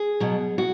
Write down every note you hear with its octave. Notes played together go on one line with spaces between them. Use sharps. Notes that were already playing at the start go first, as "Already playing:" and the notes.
Already playing: G#4
B2 F#3
F#4